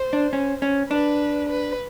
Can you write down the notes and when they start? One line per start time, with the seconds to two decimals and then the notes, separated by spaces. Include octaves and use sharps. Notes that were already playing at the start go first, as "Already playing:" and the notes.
Already playing: C5
0.13 D4
0.33 C#4
0.62 C#4
0.90 D4 B4
1.49 B4